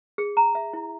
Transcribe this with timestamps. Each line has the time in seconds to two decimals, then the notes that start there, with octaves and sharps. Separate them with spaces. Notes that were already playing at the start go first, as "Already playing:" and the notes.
0.18 G#4
0.37 A#5
0.55 E5
0.73 E4